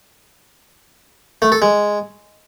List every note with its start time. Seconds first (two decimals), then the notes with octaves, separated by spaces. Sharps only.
1.42 A3
1.52 A4
1.62 G#3